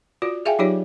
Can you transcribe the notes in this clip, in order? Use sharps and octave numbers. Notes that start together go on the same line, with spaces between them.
F4 F#4 D5
G#4 E5 F5 G5 G#5
F#3 D#4 F4 G4 C#5 D5